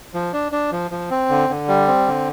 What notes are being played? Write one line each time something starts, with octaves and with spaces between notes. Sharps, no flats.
F3
D4
D4
F3
F3
C4
D3
D3
G3
C4
D3